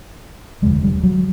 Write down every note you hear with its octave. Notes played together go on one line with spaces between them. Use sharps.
F1 D#2 D3 G#3
G3
F#3